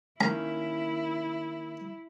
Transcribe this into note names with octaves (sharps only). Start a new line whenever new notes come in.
D#3 A#3 C#4 E4 A#5